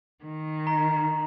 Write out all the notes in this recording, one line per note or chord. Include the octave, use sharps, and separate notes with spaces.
D#3
A#5